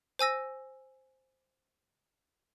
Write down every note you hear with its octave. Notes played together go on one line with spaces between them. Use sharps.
C5 G#5 E6 A#6